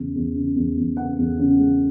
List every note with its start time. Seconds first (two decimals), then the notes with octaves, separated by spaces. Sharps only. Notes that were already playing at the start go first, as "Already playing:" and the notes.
Already playing: E2 C#3
0.15 E2
0.35 C#3
0.56 E2
0.77 E2
0.97 C#3 F#5
1.19 E2
1.39 C#3
1.59 G#3